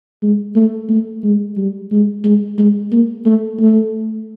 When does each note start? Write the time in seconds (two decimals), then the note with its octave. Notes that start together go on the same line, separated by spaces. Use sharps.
0.22 G#3
0.56 A3
0.89 A3
1.24 G#3
1.57 G3
1.92 G#3
2.24 G#3
2.58 G#3
2.92 A#3
3.26 A3
3.60 A3